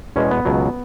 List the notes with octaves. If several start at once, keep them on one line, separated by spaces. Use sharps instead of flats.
E2 B2 G#3 C#4
B3
C#2 B2 F#3